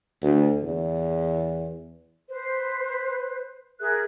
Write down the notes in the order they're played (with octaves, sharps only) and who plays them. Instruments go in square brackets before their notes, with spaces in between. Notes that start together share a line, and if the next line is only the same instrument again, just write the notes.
[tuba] D2
E2
[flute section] B4 C5
G#4 A#4 E5 F#6